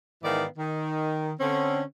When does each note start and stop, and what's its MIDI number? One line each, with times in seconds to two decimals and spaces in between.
0.23 0.44 44
0.23 0.44 51
0.23 0.44 52
0.23 0.44 59
0.23 0.44 74
0.23 0.44 77
0.58 1.31 51
1.40 1.81 50
1.40 1.81 60
1.40 1.81 61